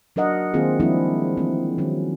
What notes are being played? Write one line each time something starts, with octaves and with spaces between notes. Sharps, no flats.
F#3 D4 A#4 D#5 F#5
D#3 A#3 C4 F4 G#4
F3 G3 G#3 C4 D4 E4
E3 A3 C4
D#3 F#3 C#4